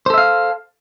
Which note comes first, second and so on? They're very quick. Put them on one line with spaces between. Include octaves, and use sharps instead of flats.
C5 A4 E5 F5